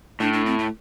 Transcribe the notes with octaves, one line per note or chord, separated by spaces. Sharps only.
A2 D4
D4
C4
A3